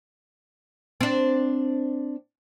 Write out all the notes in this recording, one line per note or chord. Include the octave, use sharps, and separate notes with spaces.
C4 D4